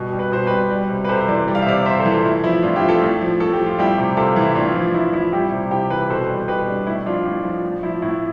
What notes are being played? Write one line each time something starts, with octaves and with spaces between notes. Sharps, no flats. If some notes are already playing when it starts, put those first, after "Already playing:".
Already playing: B2 G3
G3
B4
B2 C5
G3 G4 B4
G3
C3
B4
C3 A4 C5
C5
E3 B4 D5
G3
F5
E5
C3 D5 F5
C3 C5 E5
A4 C5
E3
F4 A4
A2 E4
F3 E4
A2 D4 F4
E4 G4
F3
F4 A4
A2
F3
A2 A4
G4
F3
F4
G3 E4 G4
C3
C3 F4 A4
E3
E4
A2 D4 F4
F3
A2 E4
F3 E4
G3 E4 G4
C3
C3 E4 G4
E3 G4 B4
B2 A4 C5
G3
B2 G4 B4
G3 D4
A2 E4
F3 D4 F4
A2
F3
A2
F3 E4
A2 E4